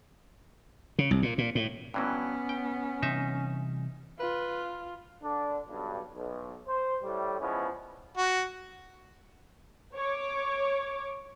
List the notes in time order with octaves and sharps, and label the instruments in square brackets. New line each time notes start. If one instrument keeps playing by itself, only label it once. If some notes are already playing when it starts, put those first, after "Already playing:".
[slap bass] C#3
C2
A#2
A#2
A2
[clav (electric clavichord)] G2 E3 F#3 [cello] B3 [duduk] C#4
[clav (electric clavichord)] G5
[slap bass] C3 E3 G3 [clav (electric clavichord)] D#4 E5
[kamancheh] F4 [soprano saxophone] B4
[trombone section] D3 D4
B1 G2
B1
C5
A2 G3
E2 F3 G#3 B3 C#4 E4
[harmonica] F#4
[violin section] C#5 D6